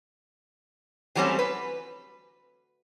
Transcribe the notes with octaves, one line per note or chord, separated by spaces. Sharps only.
E3 F#3 G3 A3 C4 C#4
B4